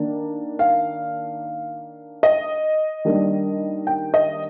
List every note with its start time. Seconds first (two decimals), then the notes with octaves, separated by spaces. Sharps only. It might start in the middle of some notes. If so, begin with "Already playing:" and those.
Already playing: D#3 A#3 D4
0.59 F5
2.23 D#5
3.05 D#3 G3 A#3 D4
3.87 G5
4.14 D#5